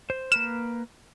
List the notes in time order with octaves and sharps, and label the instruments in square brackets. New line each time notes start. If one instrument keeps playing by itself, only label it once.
[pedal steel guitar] C5
[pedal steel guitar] A#3 B4 F6 [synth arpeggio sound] E7